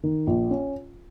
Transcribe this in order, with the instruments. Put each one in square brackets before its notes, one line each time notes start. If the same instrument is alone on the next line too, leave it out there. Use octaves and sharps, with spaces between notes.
[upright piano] D#3
A#1
C#4